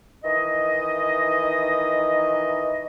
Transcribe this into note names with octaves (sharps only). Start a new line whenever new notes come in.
D#3 E3 D#5